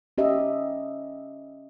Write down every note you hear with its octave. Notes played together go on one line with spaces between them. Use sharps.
C#4 G4 D#5 E5